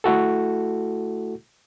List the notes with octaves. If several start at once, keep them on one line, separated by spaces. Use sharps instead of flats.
A3 E4 F#4 A4